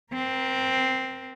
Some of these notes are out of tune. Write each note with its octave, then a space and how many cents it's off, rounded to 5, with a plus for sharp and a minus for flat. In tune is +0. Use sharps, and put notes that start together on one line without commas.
C4 +0 A#4 +35